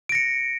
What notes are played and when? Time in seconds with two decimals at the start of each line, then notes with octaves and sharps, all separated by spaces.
0.09 D7
0.12 A#6
0.15 C#7